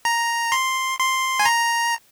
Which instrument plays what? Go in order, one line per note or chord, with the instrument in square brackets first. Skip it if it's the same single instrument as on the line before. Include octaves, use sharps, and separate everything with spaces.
[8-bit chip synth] A#5
C6
C6
G#5
A#5